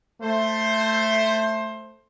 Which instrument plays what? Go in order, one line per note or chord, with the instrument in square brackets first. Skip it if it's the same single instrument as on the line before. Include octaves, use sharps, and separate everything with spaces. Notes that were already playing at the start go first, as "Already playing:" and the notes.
[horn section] A3 C5